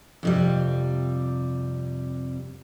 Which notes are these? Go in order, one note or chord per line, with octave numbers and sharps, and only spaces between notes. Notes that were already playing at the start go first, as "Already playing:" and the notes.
F2 C3 G3